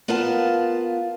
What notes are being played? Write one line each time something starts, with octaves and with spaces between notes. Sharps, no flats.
B3 F4 A#4 F5 A5